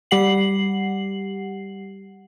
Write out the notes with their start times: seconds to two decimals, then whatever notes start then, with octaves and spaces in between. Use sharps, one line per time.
0.11 G3 G4 F#5 C7 F#7